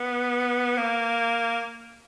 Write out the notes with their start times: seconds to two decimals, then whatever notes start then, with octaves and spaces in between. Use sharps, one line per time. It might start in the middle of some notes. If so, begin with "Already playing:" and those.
Already playing: B3
0.78 A#3